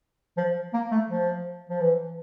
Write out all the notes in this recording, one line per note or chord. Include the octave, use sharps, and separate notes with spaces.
F3
A#3
A3
F3
F3
E3